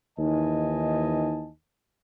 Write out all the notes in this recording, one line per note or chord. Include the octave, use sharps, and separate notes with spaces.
D#2 E3 D#4 D#5 G#5 A5